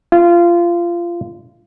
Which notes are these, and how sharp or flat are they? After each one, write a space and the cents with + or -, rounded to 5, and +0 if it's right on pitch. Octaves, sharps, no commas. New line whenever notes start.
F4 -20